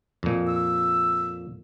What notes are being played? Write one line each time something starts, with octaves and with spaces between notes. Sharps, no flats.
F2 A#2
E6